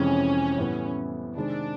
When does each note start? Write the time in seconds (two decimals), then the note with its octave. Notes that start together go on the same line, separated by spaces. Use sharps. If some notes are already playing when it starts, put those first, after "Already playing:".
Already playing: F2 C3 E3 G#3 C#4
0.58 A2 E3 G3 B3 E4
1.36 C3 D#3 G#3 C4 D4